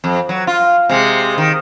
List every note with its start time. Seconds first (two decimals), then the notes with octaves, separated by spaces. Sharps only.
0.04 F2
0.29 F#3
0.47 F4
0.89 C3 G#3
1.38 D#3